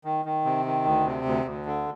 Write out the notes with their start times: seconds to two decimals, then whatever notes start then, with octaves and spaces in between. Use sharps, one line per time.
0.05 D#3
0.25 D#3
0.45 C3
0.65 D#3
0.85 D2
1.06 C3
1.25 D2
1.45 D2
1.66 D3